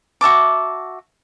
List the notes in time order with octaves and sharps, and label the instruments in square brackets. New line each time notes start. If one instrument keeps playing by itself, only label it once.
[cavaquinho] F#4 E5 A5 D6